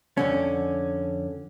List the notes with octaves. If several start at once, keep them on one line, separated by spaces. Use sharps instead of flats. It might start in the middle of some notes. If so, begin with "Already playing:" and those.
F2 D3 C#4